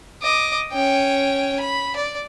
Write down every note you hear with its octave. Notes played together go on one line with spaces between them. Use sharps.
D#5 D6
C#4 G5
B5
D5